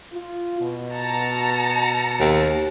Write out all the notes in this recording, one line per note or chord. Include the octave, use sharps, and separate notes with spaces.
F4
B2
A5 A#5 C#7
D#2